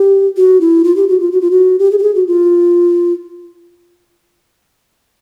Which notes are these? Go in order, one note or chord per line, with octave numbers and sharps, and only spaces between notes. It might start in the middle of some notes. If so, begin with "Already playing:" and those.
Already playing: G4
F#4
E4
F4
G4
F#4
F4
F#4
F4
F#4
G4
G#4
G4
G#4
F#4
F4